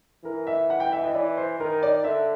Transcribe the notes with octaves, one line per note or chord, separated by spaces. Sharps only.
E3 A#4
E5
F#5
G5
E5
D#5
E3 D5
C5
D#3 A#4
D5
D3 E5